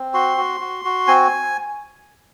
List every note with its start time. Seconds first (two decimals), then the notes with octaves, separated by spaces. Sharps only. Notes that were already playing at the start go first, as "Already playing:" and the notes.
Already playing: C4
0.14 F#4 C6
0.37 F#4
0.61 F#4
0.85 F#4
1.08 C4 G#5